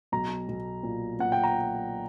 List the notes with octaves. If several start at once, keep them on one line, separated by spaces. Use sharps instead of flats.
B1 A#5
B1
A#2
A#2 F#5
G5
A#5